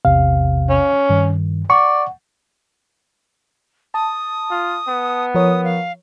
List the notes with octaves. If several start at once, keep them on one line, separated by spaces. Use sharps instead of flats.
A#1 E2 C3 F5
C#4
G2 D#3
D5 F#5 C#6
A5 D#6
F4
B3
F3 A#4 C#5 D#6
F5